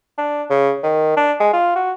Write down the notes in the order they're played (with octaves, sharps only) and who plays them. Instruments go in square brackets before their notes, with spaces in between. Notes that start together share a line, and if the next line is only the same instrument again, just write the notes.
[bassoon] D4
C#3
D#3
D4
G#3
F4
F#4